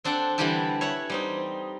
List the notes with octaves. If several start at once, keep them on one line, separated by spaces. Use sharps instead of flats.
C4 D4 A4 F#5 G5
D3 E3 G3 E4 G4 A4
C#5 E5 F#5
G3 C4 D#4